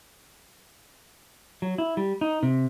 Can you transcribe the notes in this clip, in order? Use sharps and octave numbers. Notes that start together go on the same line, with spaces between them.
F#3
E4
G3
D#4
C3